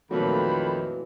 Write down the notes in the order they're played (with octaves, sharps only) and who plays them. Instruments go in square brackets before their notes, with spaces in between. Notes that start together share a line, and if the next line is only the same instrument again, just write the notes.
[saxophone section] F2 D#3 [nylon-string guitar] A#2 E3 A3 [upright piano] F#3 [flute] B5